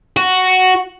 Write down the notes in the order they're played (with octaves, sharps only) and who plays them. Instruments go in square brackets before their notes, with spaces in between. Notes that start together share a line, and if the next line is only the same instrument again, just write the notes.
[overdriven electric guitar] F#4